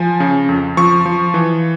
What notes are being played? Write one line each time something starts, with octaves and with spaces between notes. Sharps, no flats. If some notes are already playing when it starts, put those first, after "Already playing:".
Already playing: F3 G#5
C#3
F2
F3 C#6
F3
E3